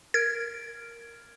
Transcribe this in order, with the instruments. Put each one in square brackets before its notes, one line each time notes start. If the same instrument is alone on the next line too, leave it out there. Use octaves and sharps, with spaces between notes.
[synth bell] A#4 F6 D7 [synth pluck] G#6